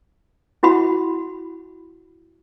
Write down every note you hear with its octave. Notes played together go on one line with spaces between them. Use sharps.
E4 F#4 F#5 B5